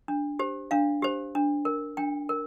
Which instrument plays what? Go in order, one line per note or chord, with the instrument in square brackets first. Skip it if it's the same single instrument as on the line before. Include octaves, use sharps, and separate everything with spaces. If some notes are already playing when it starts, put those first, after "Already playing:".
[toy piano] D4
G4 C5
D4 F5
G4 C5
D4
A#4
D4 G5
A#4